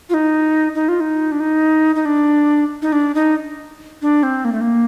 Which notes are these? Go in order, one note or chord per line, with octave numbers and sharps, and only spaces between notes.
F4
D#4
D#4
F4
D#4
D4
D#4
D#4
D4
D#4
D4
D#4
D4
C4
A#3
A3
A#3